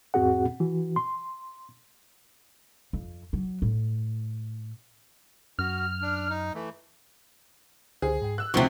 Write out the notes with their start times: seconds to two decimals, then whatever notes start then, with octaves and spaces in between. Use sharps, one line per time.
0.14 E2 G#2 C4 F#4 G#4 F#5
0.60 E3 F#4
0.96 C6
2.93 F2
3.33 F#3
3.62 A2
5.59 F#2 F#4 F6
6.02 D4
6.30 D#4
6.54 E3 A3
8.02 C#2 D3 G#4 C5
8.22 G#2 G5
8.38 E6 F#6
8.54 D2 C3 F3 D#4 F4 C#6